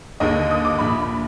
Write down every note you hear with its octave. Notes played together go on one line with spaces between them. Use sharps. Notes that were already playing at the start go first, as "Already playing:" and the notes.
D#2 D3 D#5
D#6
D6
A#1 A#2 B5